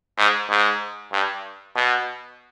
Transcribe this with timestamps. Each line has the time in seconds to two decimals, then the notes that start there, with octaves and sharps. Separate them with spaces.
0.18 G#2
0.50 G#2
1.12 G2
1.76 B2